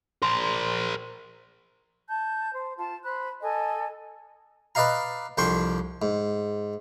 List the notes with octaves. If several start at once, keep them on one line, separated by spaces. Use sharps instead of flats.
A#4 C5 C6
A5 G6
C5
F4 A5
C5 B5 F#6
A4 D#5 G#5
B4 D5 D#5 F5 A#5
C2 F2 D4 G5 C6 C#6
G#2